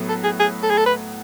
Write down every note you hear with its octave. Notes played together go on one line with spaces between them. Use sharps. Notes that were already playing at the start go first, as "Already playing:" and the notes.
Already playing: A2 F#3 B3
A4
G#4
G#4
A4
G#4
A4
B4